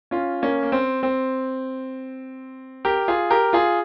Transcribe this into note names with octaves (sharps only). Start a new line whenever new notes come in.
C#4 F4
A#3 C#4
A#3
C4
C4
G4 A#4
F4 G#4
G4 A#4
F4 G#4